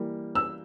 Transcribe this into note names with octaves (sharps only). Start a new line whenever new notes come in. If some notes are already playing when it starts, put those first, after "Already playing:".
Already playing: E3 G3 A#3
E6